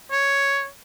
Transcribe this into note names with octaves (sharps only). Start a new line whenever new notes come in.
C#5